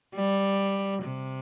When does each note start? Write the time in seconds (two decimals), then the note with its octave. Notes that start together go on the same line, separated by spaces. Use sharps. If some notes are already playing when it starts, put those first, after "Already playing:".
0.15 G3
1.02 C3